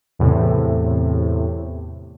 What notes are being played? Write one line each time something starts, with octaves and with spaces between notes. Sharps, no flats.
E2 A2 C3